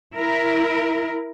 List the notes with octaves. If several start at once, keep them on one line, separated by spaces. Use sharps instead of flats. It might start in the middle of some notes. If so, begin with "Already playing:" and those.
E4 A#4